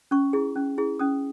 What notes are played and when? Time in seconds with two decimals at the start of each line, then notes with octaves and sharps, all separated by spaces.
0.11 C#4 C#6
0.33 E4 G#4
0.56 C#4
0.78 E4 G#4
0.99 C#4 D#6